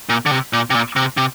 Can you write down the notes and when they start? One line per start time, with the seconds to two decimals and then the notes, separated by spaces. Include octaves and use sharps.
0.09 A#2
0.26 D3
0.31 C3
0.53 A#2
0.70 C3
0.74 A#2
0.96 C3
1.17 C3